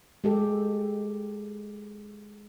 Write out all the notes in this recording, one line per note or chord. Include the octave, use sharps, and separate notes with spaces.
G#3 G4 A4